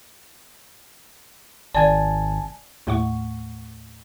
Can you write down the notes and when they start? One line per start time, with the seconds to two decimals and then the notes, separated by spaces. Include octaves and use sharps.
1.75 G#1 D5 G#5 A5
2.87 D#2 A2 A3 F#5 C#6